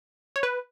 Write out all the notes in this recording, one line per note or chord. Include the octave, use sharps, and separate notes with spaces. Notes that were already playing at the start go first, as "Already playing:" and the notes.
C#5
B4